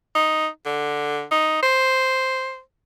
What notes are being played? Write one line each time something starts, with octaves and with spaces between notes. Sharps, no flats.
D#4
D3
D#4
C5